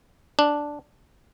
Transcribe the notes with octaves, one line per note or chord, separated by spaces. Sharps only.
D4